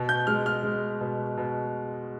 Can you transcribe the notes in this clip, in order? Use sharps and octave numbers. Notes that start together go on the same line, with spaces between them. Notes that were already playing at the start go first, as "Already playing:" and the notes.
Already playing: B2
G6
G#3 F6
F6
G#3
B2
B2